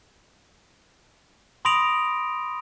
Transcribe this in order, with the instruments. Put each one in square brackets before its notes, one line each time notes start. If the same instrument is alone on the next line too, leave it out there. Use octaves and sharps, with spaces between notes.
[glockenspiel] B5 C6 D#6 A#6 D7 F7